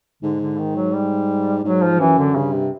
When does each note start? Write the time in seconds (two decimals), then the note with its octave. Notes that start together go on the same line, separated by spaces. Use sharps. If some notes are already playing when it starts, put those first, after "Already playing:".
0.23 G#2 D3
0.40 D3
0.58 D#3
0.76 F#3
0.94 G3
1.65 G#2 F#3
1.83 F3
2.00 F#2 E3
2.18 D3
2.36 G2 C#3
2.54 C3